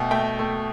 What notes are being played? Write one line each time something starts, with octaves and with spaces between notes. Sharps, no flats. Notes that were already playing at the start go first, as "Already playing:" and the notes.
Already playing: B2 A3 E5 G5
A3 E5 G5
A3